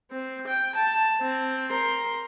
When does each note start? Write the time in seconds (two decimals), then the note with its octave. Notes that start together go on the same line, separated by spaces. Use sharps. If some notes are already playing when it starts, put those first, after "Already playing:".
0.12 C4
0.48 G5
0.76 A5
1.21 C4
1.71 A#4 C6